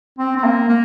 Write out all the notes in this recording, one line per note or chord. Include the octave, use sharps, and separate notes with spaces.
C4
C4
A#3
A#3